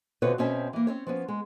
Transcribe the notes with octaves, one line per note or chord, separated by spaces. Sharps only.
B2 D3 C4 F4 B4 C#5
B2 C4 C#4 E5
E3 A#3
C4 C#4 C#5
F3 B3 C#4
G#3